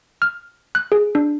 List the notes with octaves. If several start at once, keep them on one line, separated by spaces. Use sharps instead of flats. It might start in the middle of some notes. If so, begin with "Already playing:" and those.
F6
F#6
G#4
D4